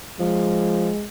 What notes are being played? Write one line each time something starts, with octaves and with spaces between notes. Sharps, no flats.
F3 G#3